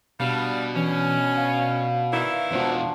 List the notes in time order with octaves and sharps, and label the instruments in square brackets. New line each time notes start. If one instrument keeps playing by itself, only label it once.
[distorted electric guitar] B2 [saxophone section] G3 F5 [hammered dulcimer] D4
[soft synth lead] E3 [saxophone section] C#4
[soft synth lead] F5
[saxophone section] D#3 E3 E4 [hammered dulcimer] D5
[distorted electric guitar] E2 B2 [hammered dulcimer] F3 D4 F#4